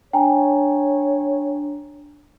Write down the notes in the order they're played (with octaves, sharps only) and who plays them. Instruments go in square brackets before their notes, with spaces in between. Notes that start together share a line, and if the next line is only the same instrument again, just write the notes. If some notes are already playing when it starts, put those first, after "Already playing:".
[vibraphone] D4 [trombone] C#5 [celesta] G5 G#5 A#5